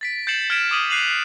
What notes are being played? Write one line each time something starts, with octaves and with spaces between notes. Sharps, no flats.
A6 B6 D7
G6 A6 C7 C#7 E7 F#7
F6 G#6 B6 D7 E7
D6 D#6 D#7 F#7
F#6 C7 D#7 F7 F#7